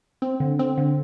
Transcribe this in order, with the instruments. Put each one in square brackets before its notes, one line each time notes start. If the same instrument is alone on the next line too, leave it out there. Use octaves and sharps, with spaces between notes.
[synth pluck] C4
D3
C4
D3